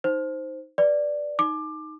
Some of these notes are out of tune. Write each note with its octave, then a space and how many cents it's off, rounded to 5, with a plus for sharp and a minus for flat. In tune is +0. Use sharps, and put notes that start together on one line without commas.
D#4 +10 C5 +0
B4 +0 D5 +0
D#4 +0 D6 +20